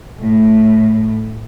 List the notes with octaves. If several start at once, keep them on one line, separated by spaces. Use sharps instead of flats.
A2